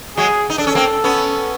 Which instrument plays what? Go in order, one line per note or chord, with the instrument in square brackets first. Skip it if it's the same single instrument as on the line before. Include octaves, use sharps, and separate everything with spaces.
[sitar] F#3 G#3 [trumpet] G#4
[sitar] D#4
[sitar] D4 [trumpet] A4
[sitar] C#4
A#3 C4
B3 C#4